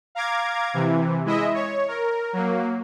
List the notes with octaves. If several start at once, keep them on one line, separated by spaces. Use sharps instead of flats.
F5 A#5 D6 G#6
C3 E3
G#3 E4 D#5 E5
C#5
A#4
F#3 A#3